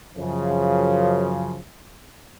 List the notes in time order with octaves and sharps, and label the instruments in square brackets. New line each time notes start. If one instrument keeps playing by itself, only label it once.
[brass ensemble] F#2 C#3 F3